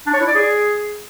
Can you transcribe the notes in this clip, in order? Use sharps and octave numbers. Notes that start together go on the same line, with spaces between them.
D4
C#5
E4
D5
G#4